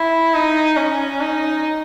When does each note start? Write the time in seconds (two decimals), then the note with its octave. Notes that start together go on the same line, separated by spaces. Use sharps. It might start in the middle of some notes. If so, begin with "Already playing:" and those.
Already playing: E4
0.34 D#4
0.76 C#4
1.20 D#4